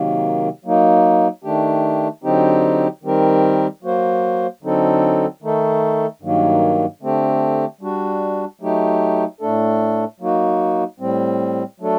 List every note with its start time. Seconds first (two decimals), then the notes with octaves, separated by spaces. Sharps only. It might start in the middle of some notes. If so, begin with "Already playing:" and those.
Already playing: C3 D#3 F#3 A#3
0.65 F#3 A#3 D#4
1.44 D#3 A3 D4 G4
2.24 D3 F#3 C4 D#4 G4
3.03 D#3 G3 C4 G4 A#4
3.83 F#3 A#3 F#4 C5
4.62 D3 F#3 C4 D#4 A4
5.42 D#3 A3 D#4 A4
6.22 G2 D#3 F#3 A#3
7.02 D3 A3 C4 G4
7.81 G3 D4 F#4
8.61 F#3 A3 D#4 G4
9.41 A2 A3 D4 A4
10.20 F#3 A#3 D#4 F#4
11.00 A2 G3 C4
11.80 F#3 A3 D4 A4